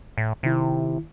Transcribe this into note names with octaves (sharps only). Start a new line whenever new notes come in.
A2
C3 D#3 E4